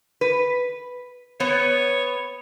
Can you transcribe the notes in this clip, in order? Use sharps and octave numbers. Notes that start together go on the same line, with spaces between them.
B4
B3 C#5